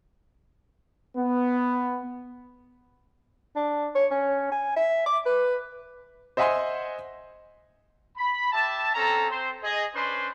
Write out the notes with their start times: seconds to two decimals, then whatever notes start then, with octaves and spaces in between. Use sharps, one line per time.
1.16 B3
3.56 D4
3.95 C#5
4.11 C#4
4.52 G#5
4.76 E5
5.06 D6
5.26 B4
6.37 C5 D#5 E5 F#5 G#5 C6
8.17 B5
8.52 G4 E5 A5
8.94 C4 C#4 A4 A#5
9.30 C4 C5
9.63 G#4 D#5
9.95 C#4 D4 B4 C5 C6